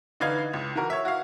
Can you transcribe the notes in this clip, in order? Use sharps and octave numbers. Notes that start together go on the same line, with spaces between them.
D3 E3 D#4 B4 F5 G#6
C#2
E3 F#4 A#4
C#5 E5
F#4 F5